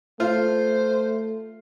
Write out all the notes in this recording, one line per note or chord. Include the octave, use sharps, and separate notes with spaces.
A3 F4 C5